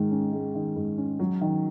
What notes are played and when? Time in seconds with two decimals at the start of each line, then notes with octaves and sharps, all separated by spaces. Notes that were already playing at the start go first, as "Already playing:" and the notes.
Already playing: G#2 D#3 G#3
0.11 C#4
0.32 G#3
0.55 D#3
0.76 G#2
0.98 C#4
1.19 F#3
1.41 D#3